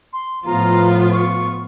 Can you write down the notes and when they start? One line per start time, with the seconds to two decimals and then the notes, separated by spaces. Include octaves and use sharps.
0.13 C6
0.46 A2 F3 B3 F4 A#5
1.12 C#6